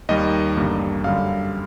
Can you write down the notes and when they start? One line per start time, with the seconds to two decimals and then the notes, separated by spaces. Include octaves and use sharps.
0.09 D#2 D#3 G3 A#3 D#5
0.56 A1 G2 D3 G3 A#3
1.04 F#2 D3 G3 F5